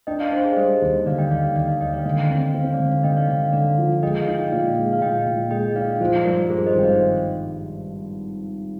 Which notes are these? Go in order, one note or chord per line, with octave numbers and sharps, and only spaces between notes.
D4 D#5 G5
D5 F5
D4 C5 D#5
G#4 C5
G3 C5 D#5
D#2
D3 D5 F5
D#5 G5
D#2 D5 F5
D5 F5
D#2 D5 F5
D#5 G5
D#2 D#5 G5
D5 F5
D3 D#5 G5
C4
C4 F5
G5
D5 F5
D3
D3 D#5 G5
D5 F5
D3 D5 F5
D3 D5 F5
F3
G#3 D#5 G5
F5
D#4 D#5 G5
A#2 D5 F5
G#3
F5
A#2 D#5 G5
A#2
G#3 D#5 G5
D#4 D5 F5
F3 C5 D#5
G2 A#4 D5
G2 G#4 C5
C5 D#5
G#1 G5
D5 F5